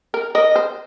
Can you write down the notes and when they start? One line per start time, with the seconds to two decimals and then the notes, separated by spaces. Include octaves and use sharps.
0.14 A#4
0.35 A#4 D#5
0.56 C5